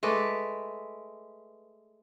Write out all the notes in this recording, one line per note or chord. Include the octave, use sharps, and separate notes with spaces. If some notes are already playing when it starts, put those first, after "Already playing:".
G#3 A3 B4 D5